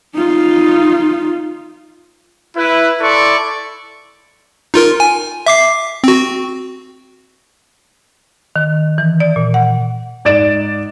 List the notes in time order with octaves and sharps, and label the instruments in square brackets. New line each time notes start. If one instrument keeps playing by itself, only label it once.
[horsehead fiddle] D#4 F4
[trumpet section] E4 B4
E4 A4 D5 C6 C#6
[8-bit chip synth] D#4 F4 A#4
G#5
E5 D6 C7
C4 F#4
[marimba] D#3
E3
D5
A#2
F#5
[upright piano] G#2 D5 A6 D7 E7